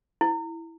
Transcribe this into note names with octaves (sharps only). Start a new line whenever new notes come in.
E4